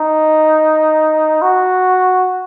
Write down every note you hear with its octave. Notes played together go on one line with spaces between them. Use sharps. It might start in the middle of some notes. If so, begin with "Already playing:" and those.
Already playing: D#4
F#4